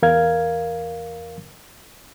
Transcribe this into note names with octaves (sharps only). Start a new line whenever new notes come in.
E2 A#4 F5 G#6